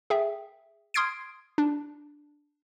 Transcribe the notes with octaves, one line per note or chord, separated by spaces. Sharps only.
G#4 E5 G5
C6 D#6 F6 G#6 C7 D7
D4